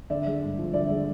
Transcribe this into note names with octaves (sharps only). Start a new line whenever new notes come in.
D3 D5 E5
G#3
G2
F3
D3 D5 E5
G#3